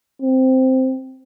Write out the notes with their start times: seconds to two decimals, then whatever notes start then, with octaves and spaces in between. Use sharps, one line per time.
0.22 C4